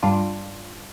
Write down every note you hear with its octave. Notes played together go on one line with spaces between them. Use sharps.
G2 G3 D4 F4